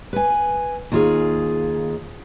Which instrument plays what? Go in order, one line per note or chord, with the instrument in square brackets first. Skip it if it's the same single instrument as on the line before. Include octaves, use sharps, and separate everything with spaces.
[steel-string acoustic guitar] B4 G#5
D#2 F4 G#4